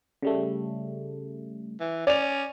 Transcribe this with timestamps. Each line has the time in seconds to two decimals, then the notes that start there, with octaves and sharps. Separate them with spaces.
0.22 C#3 G3 A3
1.80 E3
2.07 C#4 D5 F7